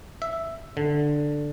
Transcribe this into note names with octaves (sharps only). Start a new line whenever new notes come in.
E5
D3